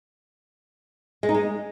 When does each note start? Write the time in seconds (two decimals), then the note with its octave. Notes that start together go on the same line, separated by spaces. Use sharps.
1.23 G#3
1.29 D#4
1.34 G#3